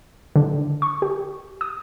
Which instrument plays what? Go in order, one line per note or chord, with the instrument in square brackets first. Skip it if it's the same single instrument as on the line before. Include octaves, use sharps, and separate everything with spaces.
[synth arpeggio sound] D3
C#6
G4
D#6